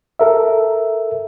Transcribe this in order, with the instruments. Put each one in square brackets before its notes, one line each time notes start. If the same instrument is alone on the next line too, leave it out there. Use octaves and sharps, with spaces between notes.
[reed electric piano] A4 A#4 E5